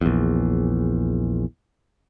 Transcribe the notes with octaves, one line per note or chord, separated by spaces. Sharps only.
A#1 E2